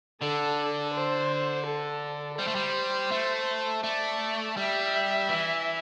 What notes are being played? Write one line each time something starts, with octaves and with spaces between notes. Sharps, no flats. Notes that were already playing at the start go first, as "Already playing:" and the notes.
D3 A4
C5
A4
G3 C5
A3
G3
A3
A3 D5
G3 E5
E3